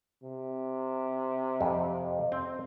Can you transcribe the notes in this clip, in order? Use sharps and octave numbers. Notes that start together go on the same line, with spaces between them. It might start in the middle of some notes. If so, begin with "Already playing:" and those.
C3
F2
C4